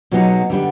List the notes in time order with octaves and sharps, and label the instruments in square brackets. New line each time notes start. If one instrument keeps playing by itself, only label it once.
[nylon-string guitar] B2 F#3 B3 D#4 G#4
D3 G3 B3 D4